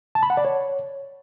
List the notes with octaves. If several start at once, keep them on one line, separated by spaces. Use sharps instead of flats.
A5
B5
F#5
D5
C#5